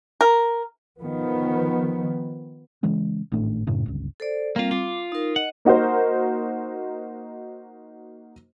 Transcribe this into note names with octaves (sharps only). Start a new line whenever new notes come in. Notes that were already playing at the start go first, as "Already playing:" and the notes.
A#4
D#3 F3 B3
C#3 E3 G#3 C#4
G#1 A2 A3 D4
F#2 A2 C#3
G1 C#2
A4 C5 D5
G3 A#3 C4 F4
F4 D6
D#4 A#4
D#5 F#5
A#3 D#4 F#4 A#4 C5